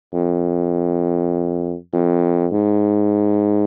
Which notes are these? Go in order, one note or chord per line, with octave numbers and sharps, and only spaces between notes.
F2
F2
G#2